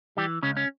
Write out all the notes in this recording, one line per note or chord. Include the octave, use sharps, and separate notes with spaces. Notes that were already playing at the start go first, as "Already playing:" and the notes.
E3 G3 G4
C#2 C#3 C#4
C#4